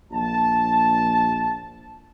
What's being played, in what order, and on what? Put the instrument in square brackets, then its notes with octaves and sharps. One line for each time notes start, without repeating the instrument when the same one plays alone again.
[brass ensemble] A#1 A5